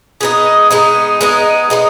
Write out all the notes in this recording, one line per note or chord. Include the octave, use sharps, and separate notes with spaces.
G#3 B3 D#4
G#3 B3 D#4
G#3 B3 D#4
G#3 B3 D#4